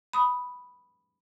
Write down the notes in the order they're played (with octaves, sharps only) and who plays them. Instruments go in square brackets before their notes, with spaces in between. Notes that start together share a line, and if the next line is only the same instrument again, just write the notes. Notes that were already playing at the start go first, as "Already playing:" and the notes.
[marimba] B5 D#6